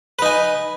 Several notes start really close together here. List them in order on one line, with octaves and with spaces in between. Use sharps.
B4 D#4 G#5